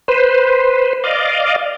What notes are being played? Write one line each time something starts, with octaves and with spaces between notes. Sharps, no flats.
B4 C5
D5 D#5 F5